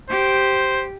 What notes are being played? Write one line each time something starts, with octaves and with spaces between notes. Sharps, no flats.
G4 C5